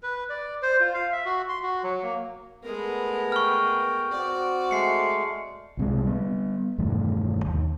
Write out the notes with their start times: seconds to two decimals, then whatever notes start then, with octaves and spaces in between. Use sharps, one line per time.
0.03 B4
0.29 D5
0.62 C5
0.80 F4
0.94 F5
1.12 E5
1.25 F#4
1.49 C6
1.63 F#4
1.84 F#3
2.03 A#3
2.63 G#3 A3 B3 A#4
3.32 G5 C#6 F6
4.12 C4 F#4 D5
4.71 G#3 A3 C7 C#7
5.77 C2 C3 G#3
6.05 G3 B3
6.78 E1 G2 D#3 A3
7.46 D#2